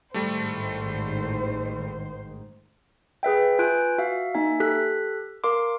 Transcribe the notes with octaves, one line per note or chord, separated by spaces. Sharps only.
A1 G#2 D#3 G3 A3 C5
G#4 B4 E5 G5
F4 B4 G#5 F#6 G6 D7
F#4 E5 F5
A#3 D#4 E5 G#5
G4 A4 F#6 B6
A#4 F5 C6 D6